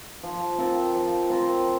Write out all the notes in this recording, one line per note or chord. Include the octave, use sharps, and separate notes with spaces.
F3
C4 F4 A#4
F3
C4 F4 A#4